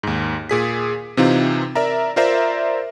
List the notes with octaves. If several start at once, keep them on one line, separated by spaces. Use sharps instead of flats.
D#2 G#2
A#2 G#4 B6
C3 E3 C4 D#4 F4
A#4 D5 E5 A#5
F4 A#4 C5 D5 E5 A#5